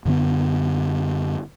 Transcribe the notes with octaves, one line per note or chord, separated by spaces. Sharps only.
F#2 D3 B3